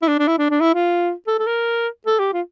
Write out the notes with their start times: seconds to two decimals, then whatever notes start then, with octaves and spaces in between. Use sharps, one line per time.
0.02 E4
0.08 D4
0.19 D4
0.27 E4
0.38 D4
0.50 D4
0.60 E4
0.74 F4
1.27 A4
1.39 A4
1.47 A#4
2.06 A4
2.19 G4
2.33 F4